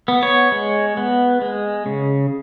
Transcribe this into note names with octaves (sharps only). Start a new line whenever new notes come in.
B3
C#5
G#3
B3
G#3
C#3